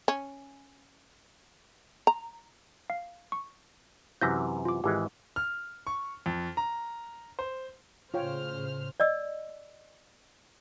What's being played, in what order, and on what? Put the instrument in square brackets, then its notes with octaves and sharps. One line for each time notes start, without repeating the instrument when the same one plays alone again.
[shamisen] C#4
A#5
[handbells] F5
C#6
[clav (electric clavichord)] F#2 C3 E3 [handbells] G6 A#6 B6
[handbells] F4 D6
[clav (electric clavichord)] G#1 E3 G#3 [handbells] G4
[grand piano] F6
C#6
F2
A#5
C5
[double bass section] A2 C#3 [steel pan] F4 C#5 G5 [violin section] C5 F6
[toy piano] D5 D#5 E6